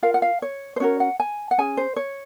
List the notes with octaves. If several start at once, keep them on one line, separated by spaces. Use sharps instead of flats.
F4 A#4 F5
F#5
F5
C#5
C5
C#4 F#4 A#4 C#5
F#5
G#5
F#5
C#4 G#4 G#5
C5
C#5